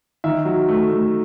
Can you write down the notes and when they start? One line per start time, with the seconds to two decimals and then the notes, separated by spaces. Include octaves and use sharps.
0.24 D#3 E5
0.45 F#3
0.68 A3
0.90 A3